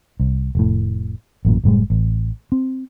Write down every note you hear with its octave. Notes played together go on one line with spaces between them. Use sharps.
C2
F1 A2
A1 F#2 A#2
F#1 A2 G3 G#3
A1
C4